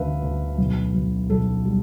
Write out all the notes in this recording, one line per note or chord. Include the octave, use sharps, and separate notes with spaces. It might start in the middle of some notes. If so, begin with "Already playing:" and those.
Already playing: D2 D3 A3 B4 E5 F5
D2
B1
B1
B1 A4
G3